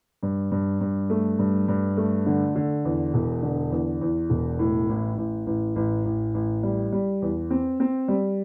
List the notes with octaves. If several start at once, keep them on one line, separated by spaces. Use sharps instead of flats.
G2
G2
G2
A3
G2
G2
A3
D3
D3
E2
E1
D3
E2
E2
E1
A2
A1
A1
A1
A1
A1
A1
G3
G3
E2
C4
C4
G3